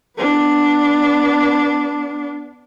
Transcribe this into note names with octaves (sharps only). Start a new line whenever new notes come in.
B3 D4